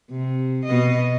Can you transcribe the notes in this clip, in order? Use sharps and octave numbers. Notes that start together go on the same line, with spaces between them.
C3
B2 D#5